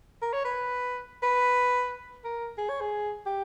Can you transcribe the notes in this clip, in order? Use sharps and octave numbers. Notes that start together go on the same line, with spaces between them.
A#4
C#5
B4
B4
A#4
G#4
C#5
G#4
G4